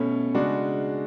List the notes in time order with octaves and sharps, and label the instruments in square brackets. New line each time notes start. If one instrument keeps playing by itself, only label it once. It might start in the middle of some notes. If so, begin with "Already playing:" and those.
Already playing: [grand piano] B2 A3 C#4
C#3 G#3 D4 F#4